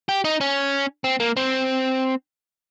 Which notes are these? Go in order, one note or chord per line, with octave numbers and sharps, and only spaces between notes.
G4
D#4
C#4
C4
A#3
C4